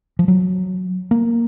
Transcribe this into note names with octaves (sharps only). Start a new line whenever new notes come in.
F3
F#3
A#3